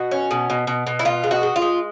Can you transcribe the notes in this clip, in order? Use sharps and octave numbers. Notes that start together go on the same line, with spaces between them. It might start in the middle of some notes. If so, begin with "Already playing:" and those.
Already playing: B2 F#4
C#4
B2
B2
B2
B2
E4
B2 F4
G#3
F#4
G#3
F4
G#3